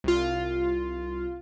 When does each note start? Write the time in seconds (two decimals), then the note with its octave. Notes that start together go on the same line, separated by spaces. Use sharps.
0.04 C2 F4